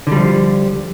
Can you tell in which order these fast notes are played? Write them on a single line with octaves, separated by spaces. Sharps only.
D3 G3 F3